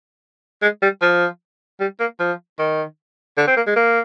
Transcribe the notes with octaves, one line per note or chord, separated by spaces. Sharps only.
G#3
G3
F3
G3
A#3
F3
D#3
D3
C4
A#3
G#3
A#3